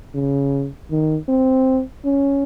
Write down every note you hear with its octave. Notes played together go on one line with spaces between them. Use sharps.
C#3
D#3
C4
C#4